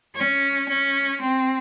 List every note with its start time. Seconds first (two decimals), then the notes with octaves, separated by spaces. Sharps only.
0.16 C#4
0.68 C#4
1.21 C4